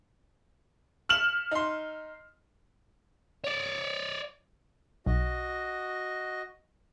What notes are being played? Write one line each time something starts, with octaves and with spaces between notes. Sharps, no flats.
F6 E7 F#7
D#4 C6
C#5 D5
B1 F#4 D#5